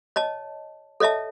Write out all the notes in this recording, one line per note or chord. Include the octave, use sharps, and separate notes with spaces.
C#5 D#5 A5
A4 C#5 D#5 E5 A5